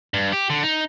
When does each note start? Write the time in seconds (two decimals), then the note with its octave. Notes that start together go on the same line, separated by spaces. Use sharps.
0.14 G2
0.32 G4
0.50 D3
0.63 D#4